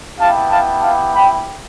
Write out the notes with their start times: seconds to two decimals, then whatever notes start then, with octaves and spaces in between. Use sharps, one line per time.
0.19 B3 E4 G4 F5 A5
0.50 F5 A5
0.81 F5 A5
1.12 G5 B5